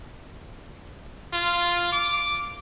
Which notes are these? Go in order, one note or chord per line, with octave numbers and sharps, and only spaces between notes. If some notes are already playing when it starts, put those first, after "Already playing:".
F4
D6